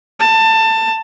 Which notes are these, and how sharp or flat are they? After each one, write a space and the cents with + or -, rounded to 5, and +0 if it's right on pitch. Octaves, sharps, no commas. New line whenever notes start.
A5 +20